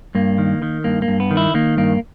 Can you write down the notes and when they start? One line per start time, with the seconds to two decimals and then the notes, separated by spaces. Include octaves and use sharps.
0.15 G2 A#3
0.38 D#3
0.62 D#3
0.84 G2 A#3
1.02 A#3
1.08 G2
1.20 B3
1.31 D#3
1.37 E4
1.54 D#3 A#3
1.78 G2 A#3